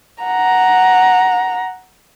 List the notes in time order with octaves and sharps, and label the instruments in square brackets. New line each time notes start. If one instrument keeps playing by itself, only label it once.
[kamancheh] F#5 A#5